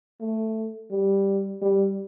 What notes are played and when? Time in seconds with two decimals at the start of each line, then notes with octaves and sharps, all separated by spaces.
0.21 A3
0.91 G3
1.62 G3